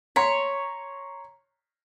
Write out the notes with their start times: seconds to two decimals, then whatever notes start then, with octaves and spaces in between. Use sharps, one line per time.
0.16 C#5 A#5 C6 B6